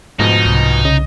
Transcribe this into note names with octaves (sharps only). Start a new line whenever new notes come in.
D2 G#2 B2 F3 D#4
C2
C#3 D#5